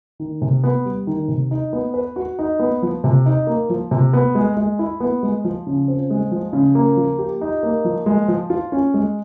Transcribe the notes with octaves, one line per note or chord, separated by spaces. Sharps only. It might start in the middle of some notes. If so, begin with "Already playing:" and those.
D#3
C3
B3
G3
D#3
C3
D#4
B3
B4
F#4
D#4
B3
F3
C3
D#4
A#3
F3
C3
B3
G#3
G#3
E4
B3
G#3
F3
C#3
C4
G#3
F3
C#3
A#3
F3
G4
D#4
A#3
F3
G#3
F3
F4
C#4
G#3